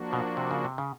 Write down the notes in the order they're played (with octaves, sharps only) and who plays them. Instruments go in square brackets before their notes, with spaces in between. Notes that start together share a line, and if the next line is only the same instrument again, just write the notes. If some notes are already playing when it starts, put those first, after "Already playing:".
Already playing: [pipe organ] F3 A#3 D4 F#4
[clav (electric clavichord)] B2
C3
C#3
C3
C#3